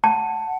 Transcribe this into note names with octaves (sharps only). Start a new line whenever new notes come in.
F#5 A5